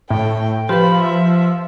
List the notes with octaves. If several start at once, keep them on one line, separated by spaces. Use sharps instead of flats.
A2 G5
F3 G4 B4 B5
E5